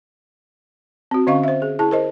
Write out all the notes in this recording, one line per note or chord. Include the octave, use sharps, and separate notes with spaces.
C4 F#4
D3 C#4 D#5 F5 C#6
C5 E5
G#4
E4 G#4 A5
A#4 C5 D#5